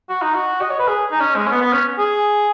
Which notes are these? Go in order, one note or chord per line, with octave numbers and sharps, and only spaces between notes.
F#4
D#4
F#4
D#5
C#5
B4
G#4
D#4
C#4
G#3
C#4
B3
B3
C#4
G#4